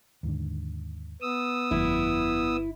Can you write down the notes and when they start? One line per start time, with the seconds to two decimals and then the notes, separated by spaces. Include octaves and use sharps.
0.23 D#2 G#2 D3
1.22 B3 D#6 E6
1.71 G1 F2 F3 A3 E4